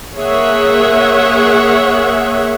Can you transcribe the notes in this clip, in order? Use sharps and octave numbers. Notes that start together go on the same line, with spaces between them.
A#3 G#4 C#5 E5 F#5